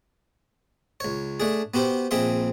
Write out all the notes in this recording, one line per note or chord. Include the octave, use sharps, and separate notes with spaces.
C#2 C#5
A3 D4 G#4
B3 F#4 G4 C5
A#1 C4 G#4 E5 C6